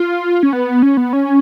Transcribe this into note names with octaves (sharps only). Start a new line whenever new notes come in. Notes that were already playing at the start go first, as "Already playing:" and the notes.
Already playing: F4
C#4
B3
C#4
B3
C#4